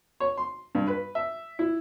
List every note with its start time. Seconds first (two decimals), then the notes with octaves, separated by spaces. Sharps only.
0.20 C#5
0.37 C6
0.75 G2
0.87 B4
1.15 E5
1.59 E4